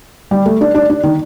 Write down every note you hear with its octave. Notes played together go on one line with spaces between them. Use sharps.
G3
A3
D4
D4
D4
D#3